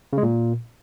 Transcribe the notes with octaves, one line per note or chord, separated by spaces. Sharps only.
C#3
G#3
A#2